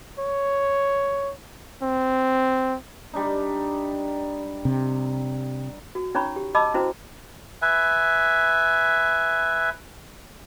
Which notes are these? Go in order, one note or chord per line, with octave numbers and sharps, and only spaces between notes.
C#5
C4
G3 D4 D#4
C3
F#4
C#4 D#4 C#5 A#5 B5 C#6
G4
D#5 A5 B5 D6 E6
C#4 E4 F#4 C5 A#5
B4 E5 G#5